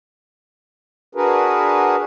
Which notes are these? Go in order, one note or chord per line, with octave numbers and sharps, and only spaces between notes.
D4 F#4 G#4 A#4 B4